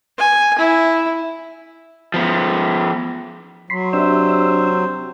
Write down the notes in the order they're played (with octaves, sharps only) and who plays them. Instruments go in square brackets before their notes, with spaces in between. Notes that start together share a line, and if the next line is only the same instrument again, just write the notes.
[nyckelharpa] G#5
E4
[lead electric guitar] F3 B3
[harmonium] F#3 [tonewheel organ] B5 C6
[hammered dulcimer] C3 [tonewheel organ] D4 E6 [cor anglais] C5